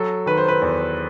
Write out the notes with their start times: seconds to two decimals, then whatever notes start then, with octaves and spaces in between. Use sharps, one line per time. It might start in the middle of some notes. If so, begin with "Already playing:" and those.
Already playing: F#3 A4
0.26 D#3 B4
0.37 C5
0.48 B4
0.62 E2